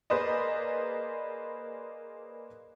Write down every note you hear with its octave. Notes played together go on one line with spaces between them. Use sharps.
A#3 G#4 B4 C5 D5 D#5